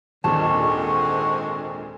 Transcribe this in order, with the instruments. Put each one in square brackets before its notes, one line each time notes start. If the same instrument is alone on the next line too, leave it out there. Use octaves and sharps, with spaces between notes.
[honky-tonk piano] G#1 D#2 A#2 [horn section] D3 G#3 C4 [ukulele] A5 [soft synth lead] C#6